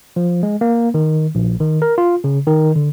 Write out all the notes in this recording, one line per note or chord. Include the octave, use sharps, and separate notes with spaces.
F3
G#3
A#3
D#3
A#1
D#3
A#4
F4
C#3
D#3
D3